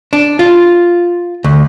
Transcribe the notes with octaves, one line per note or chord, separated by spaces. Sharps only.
D4
F4
D2